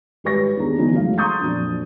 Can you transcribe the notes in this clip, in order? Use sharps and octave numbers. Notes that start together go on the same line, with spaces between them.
G#1 G3 B4 C#5 C#6 A#6
D#2 B3 D4 G#4 A#5
D3 E3 F#3 B3 C#4 D#4
C#2 F#2 A3 E4 C#5 F5
A#5 C6 C#6 D#6 G6 A6
F2 A#2 F#3 D4